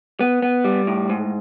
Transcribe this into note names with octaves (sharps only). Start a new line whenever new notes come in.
B3
B3
G3
A2
G#2